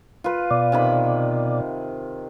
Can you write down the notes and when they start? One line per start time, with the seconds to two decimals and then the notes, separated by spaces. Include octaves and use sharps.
0.24 F4 B4
0.51 B2 D5
0.72 C3 D#3 B5